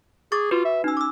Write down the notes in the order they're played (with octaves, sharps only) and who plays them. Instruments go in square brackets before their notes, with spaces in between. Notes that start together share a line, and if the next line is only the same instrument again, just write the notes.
[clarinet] G#4 [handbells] C#6 D6 A6
[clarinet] F4 [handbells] F#4 B4
[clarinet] E5
[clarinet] C#4 [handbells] D#4 E6
[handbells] D6 E6